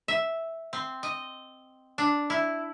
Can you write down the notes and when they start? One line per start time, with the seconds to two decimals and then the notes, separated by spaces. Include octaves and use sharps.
0.08 E5
0.73 C4
1.03 D#5
1.98 D4
2.30 E4